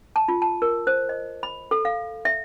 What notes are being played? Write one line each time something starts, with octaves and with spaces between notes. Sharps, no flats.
A5
F4
A5
A#4
C5
D#5
B5
A4
F5
E5